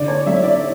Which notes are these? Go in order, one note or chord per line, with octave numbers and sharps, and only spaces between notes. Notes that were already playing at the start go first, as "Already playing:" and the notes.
Already playing: D3 D5
C#5
F#3 E5
D5